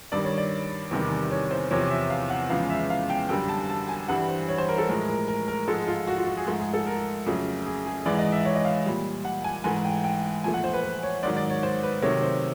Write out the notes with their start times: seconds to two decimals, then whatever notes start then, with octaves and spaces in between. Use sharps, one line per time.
0.12 G2 D#3 G3 D5
0.24 C#5
0.38 D5
0.91 E2 C3 D#3 G3
1.31 C#5
1.51 C5
1.71 E2 C3 F3 C#5
1.91 E5
2.10 F5
2.30 F#5
2.50 E2 C#3 F3 G#3 F5
2.70 E5
2.90 F5
3.10 G5
3.29 F#2 D3 G3 G5
3.49 A5
3.69 A5
3.89 G#5
4.08 G2 E3 G3 F#5
4.29 C5
4.48 C#5
4.58 C5
4.69 A#4
4.78 A4
4.88 A2 F3 G#3 A#4
5.08 A#4
5.28 A#4
5.48 A#4
5.68 G#2 F3 G#3 A4
5.87 F4
6.07 F#4
6.17 F4
6.27 F#4
6.37 G#4
6.47 G#2 F3 A3
6.60 G#4
6.74 A4
6.86 A#4
7.26 F2 C#3 F#3 A3
7.66 G#4
7.86 G#4
8.06 G#2 E3 G#3 D5
8.19 D#5
8.32 E5
8.45 C#5
8.55 D#5
8.65 F5
8.86 A#2 G3
9.25 F#5
9.44 G#5
9.64 G#2 E3 A3 G#5
9.85 G5
10.04 G5
10.44 A#2 F3 A3 G#5
10.54 F#5
10.64 C5
10.73 B4
10.83 B4
11.03 C#5
11.23 G#2 D#3 F#3 D5
11.37 D5
11.50 C#5
11.63 C5
11.83 B4
12.02 C3 D#3 F#3 A3 C#5
12.23 C5